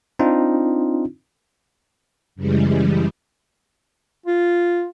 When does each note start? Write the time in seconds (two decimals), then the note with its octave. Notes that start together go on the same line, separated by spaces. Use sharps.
0.19 C4 D4 D#4 F4
2.36 F#2 C#3 E3 G3 G#3
4.26 F4